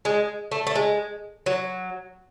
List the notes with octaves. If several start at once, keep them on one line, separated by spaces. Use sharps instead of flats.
G#3
A3
A3
G#3
F#3